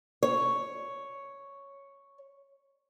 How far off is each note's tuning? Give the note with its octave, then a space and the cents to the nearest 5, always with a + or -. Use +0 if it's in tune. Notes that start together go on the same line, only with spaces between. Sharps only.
C#5 +0